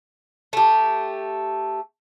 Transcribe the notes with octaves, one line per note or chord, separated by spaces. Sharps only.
A3 G4